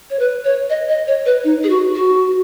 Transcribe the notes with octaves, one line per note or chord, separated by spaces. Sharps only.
C#5
B4
C#5
D#5
D#5
C#5
B4
D#4
G#4
F#4
F#4